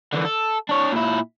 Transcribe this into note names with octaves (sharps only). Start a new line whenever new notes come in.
D3 E3
A4
D4 C#5
A#2 E4